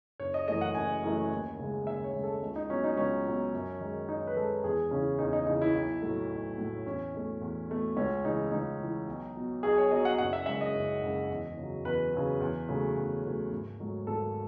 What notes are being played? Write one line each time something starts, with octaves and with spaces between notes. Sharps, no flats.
F#1 C#5
D#5
F#2 E3 A3 D#5
F#5
F#1 G#5
F#2 E3 A3
D#2
C#3 G#3
D#2 E5
C#5
C#3 G#3
A4
C#2
D#4
B2 F#3 C#4
D#4
C#2 C#4
B2 F#3
F#2
D#3 G#3
F#2 D#4
B4
D#3 G#3 A4
E2 G#4
C#3 E3 C#4
E2 D#4
D#4
C#3 E3 D#4
E4
B1
A2 F#3 A3
B1
A2 F#3 A3
E2 C#4
B2 A3
E2
B2 A3
C#2 C#4
C#3 E3 D#4
C#2 D#4
C#3 E3
B1
B2 F#3
B1 G#4
C#5
B2 F#3 D#5
F#5
F#1 F#5
E5
F#2 C#3 G#3 E5
D#5
F#1
F#2 C#3 G#3
E2
C#3 F#3
E2 B4
C#3 F#3
E2
C#3 F#3 A3
E2
C#3 F#3 A3
G#1
G#2 F#3 A3
G#1 A4